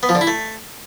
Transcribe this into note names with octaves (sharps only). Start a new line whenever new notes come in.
B3
F3
D3
E4
A3